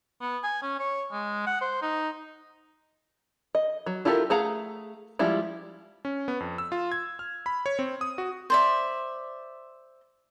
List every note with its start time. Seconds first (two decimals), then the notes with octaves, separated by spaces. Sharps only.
0.21 B3
0.44 G#5
0.62 C#4
0.79 C#5
1.12 G#3
1.46 F#5
1.61 C5
1.82 D#4
3.55 D#5
3.86 F#3
4.05 E4 F4 G4 A4 A#4
4.30 A3 G#4 F5 F#5 A#5
5.19 F3 G3 G#3 E4 F4
6.05 C#4
6.28 B3
6.40 F2
6.58 E6
6.72 F4
6.92 G#6
7.19 F6
7.46 B5
7.66 C#5
7.79 C4
8.01 D#6
8.18 F#4
8.50 C5 D5 E5